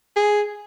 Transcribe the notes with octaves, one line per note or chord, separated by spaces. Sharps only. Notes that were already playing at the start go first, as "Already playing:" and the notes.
G#4